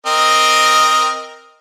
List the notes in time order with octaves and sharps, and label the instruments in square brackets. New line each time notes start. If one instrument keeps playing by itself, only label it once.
[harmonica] C4 A#4 D#5